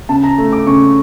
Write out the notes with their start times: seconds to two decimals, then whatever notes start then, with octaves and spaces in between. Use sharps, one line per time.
0.09 C#3 A5
0.23 A#5
0.38 A3
0.52 D6
0.67 C#3 C#6